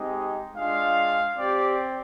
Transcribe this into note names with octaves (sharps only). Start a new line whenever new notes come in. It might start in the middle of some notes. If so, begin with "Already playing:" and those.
Already playing: G#3 C4 D#4 G4
G#3 D4 F4 F5
C4 G4 D5